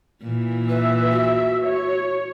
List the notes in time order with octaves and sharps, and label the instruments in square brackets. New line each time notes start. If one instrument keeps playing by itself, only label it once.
[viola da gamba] A#2 E3
[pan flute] B4 [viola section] E5
[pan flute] F#4
[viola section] C#5